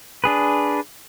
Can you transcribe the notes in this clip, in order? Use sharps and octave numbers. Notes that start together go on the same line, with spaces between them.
D4 G#4 B4